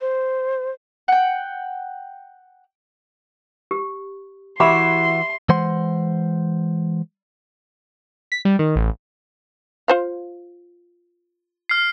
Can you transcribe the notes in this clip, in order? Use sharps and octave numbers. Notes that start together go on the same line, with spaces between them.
C5
F#5 G5
G4
E3 E4 F#4 G4 E5 B5 C6 D6
E3 G#3 C5 F#5 C6
B6
G3
D#3
A1
F4 C5 F5
F6 C7